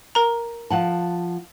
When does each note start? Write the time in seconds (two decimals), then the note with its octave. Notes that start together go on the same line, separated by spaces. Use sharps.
0.15 A#4 A#5
0.70 F3 F#5 A5